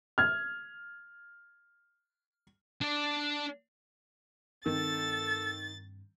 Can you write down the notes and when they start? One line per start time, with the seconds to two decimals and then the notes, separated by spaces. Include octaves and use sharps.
0.18 F6 G#6
2.81 D4 D5
4.66 G2 D#3 C4 A4 A6